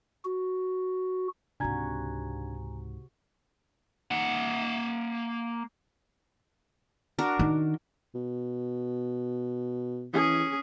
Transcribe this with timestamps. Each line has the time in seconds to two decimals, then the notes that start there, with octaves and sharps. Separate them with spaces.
0.25 F#4
1.60 C#2 G#2 C3 D4 F#4 G#5 A#5 G#6
4.11 A#3 F#5
7.19 D4 F#4 A#4
7.39 D#3
8.15 B2
10.14 E3 C#4 G#4